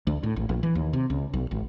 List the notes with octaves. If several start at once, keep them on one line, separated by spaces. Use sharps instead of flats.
D2
A2
A1
A#1
E3
D#2
C3
C#2
B1
G#1